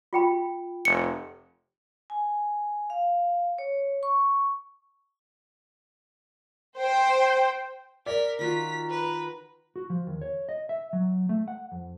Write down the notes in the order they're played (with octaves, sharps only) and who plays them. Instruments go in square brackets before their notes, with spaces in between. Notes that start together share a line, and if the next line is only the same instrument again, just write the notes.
[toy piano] F4 G5 B5
[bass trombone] F1 [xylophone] C#7
[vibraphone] G#5
F5
C#5
C#6
[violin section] C5 G5
[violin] A#4 B6 [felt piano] D5
[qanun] D#3 F4 F#4 [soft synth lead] A#5 [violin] B6
[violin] B4
[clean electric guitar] F#4
F3
D#2
C#5
D#5
E5
F#3
A3
F#5
F2